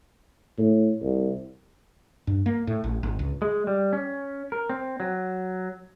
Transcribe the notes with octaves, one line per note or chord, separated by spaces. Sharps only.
A2
C2
G2
A#3
A2
A1
G#1
C#2
G#3
G3
C#4
A#4
C4
F#3